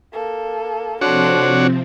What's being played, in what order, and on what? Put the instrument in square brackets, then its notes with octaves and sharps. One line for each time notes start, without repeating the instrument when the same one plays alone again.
[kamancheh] A#3 A4
[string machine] C3 F3 C4 [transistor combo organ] D4 F#4 C#5 [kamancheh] A4 C6